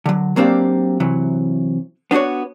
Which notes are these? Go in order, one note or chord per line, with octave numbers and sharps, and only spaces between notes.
D3 F#3
F#3 A#3 C4 D4 G4 F5
C3 E3 F#3
B3 D4 D#4 F#4 C#5